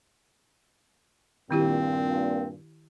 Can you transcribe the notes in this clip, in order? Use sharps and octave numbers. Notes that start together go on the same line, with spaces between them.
G2 A#2 D#3 C4 E4 G4